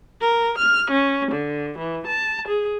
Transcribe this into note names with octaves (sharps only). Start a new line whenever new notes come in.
A#4
F6
C#4
D3
E3
A5
G#4